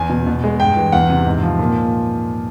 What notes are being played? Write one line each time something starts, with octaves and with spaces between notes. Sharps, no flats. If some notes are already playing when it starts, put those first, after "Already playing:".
Already playing: E2 G#5
B2
B2
G#3
G2 G5
E3
E2 F#5
C3
G#2
F3
A#2